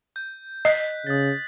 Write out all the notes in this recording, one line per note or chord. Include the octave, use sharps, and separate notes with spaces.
G6
D#5 F#6 B6
C#3 D#6 A6